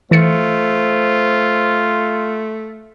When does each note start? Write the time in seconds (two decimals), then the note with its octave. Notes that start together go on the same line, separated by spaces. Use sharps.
0.11 E3 A3 F4 C5 A6 C#7